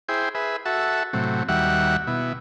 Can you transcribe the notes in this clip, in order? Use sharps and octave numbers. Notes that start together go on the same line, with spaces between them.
E4 G#4 C5 G5
G#4 B4 E5
F#4 A4 E5
A2 C3 F#3
D#2 G3 F#4 E5 F#5
B2 E4